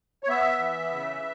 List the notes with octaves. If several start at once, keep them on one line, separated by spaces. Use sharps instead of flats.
C#5
B3 E5
E3
C#3